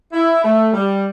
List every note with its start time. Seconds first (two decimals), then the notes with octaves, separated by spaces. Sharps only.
0.13 E4
0.43 A3
0.73 G3